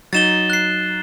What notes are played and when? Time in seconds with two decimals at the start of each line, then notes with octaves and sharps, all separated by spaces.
0.13 F#3 D#4 A6 E7 G7
0.50 F#6 C7